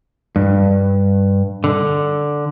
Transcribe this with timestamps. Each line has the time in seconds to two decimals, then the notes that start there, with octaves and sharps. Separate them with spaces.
0.36 G2
1.64 D3